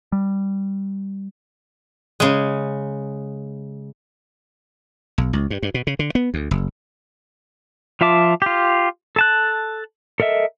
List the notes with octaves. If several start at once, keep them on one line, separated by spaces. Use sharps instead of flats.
G3
C#3 G#3
B1
C#2
G2
G2
B2
C#3
D3
B3
D2
F#1
F3 F4 E5 A5 D6
F4 G4
A4 A5 F#6
A4 A#4 D#5 E5